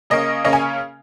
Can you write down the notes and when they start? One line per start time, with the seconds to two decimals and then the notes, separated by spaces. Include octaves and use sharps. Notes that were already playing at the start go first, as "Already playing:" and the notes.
0.10 C#3 A#3 C#4 D#5
0.44 C#3 A#3 C#4 D#5
0.53 G#5